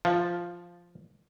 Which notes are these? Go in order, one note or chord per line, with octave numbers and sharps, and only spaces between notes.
F3